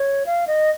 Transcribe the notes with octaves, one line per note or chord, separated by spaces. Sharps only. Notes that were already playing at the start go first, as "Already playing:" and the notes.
Already playing: C#5
F5
D#5